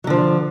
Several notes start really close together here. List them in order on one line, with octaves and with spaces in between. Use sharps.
F#3 D3 F3